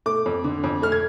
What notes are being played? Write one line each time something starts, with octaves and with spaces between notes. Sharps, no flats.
A3 D6
F2
D3
F2
A3 F6
G#6